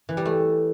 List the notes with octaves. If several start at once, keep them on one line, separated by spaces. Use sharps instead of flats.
E3
G3
A3